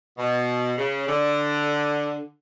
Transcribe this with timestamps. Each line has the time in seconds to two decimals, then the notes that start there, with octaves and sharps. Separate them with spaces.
0.18 B2
0.78 C#3
1.08 D3